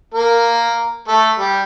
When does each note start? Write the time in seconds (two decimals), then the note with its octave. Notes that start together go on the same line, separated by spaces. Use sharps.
0.14 A#3 A#4
1.08 A3 A4
1.39 G3 G4